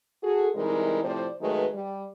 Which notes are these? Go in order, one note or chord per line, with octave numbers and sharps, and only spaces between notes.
F#4 G#4 A4
C3 E3 G3 G#3 D#4 A#4
A2 C3 F3 C4 C5 D5
D#3 F#3 G#3 A3 B4
G3